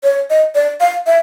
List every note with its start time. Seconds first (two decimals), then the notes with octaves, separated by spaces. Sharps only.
0.03 C#5
0.30 D#5
0.55 D5
0.80 F5
1.06 E5